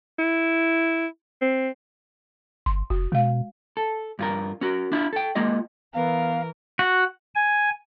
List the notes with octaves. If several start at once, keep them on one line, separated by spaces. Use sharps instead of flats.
E4
C4
G1 C6
F1 F#4
B2 G#3 F5
A4
G2 F4 A#4
C#4 F#4 A#4
D4 E4 F4
A4 G5
G#3 A#3 F4 D#5
E3 B3 A#4 F5
F#4
G#5